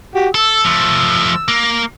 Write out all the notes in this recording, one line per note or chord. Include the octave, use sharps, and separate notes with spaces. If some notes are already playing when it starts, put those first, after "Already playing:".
F#4 G4
A4 E6
F3 A3
A#3